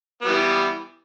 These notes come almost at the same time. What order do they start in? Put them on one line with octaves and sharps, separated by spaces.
B3 G3 E3